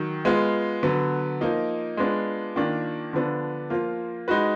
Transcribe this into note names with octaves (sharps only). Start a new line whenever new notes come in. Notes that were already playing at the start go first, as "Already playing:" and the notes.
Already playing: D#3 F#3
G#3 B3 F4
D3 F#3 B3
F3 A#3 D#4
G#3 B3 D4 F4
D#3 A#3 D4 F4
D3 F3 B3 D4
F3 A#3 F4
G#3 D#4 F#4 B4